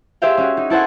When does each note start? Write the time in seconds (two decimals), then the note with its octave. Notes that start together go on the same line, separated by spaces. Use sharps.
0.22 G4 G#4 C5 E5 F5 G5
0.38 C#4 F#4
0.57 D#4
0.70 E4 A4 C5 F#5 G#5